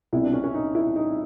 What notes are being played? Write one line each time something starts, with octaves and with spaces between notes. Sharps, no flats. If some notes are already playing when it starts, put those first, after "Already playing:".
C2 B2 E4
D4
C#4
C#4
D#4
E4
D#4